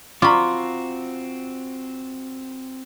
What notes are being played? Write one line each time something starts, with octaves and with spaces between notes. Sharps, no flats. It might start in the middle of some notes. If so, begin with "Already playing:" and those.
C4 F4 F#4 A#5 B5 C#6 D6